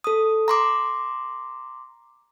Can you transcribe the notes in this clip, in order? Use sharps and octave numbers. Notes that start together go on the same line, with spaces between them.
A4 D#6
A#5 C6 D6